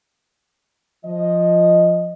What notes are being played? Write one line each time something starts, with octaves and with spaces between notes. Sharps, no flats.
F3 D#5